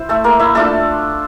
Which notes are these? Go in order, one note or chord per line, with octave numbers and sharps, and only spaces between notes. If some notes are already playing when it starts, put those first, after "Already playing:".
Already playing: E4 C5
A3 A4
A#3 A#4
E4 E5
A3 D4 F4 A4 A5